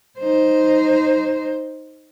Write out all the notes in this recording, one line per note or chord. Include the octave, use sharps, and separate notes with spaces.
D#4 C5